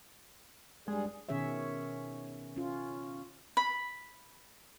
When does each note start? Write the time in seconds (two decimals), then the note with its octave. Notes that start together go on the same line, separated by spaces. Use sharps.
0.88 G2 G3 G#3 G#4
1.29 B2 D#3 C#4 G#4 C#5 E5
2.56 C#4 F4
3.57 B5